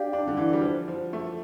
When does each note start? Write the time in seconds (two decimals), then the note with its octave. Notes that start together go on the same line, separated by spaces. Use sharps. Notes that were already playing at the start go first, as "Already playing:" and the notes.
Already playing: D4 G4 D5 F5
0.13 D4
0.27 D3
0.37 E3
0.53 G3
0.62 F3
0.88 F3
1.13 A3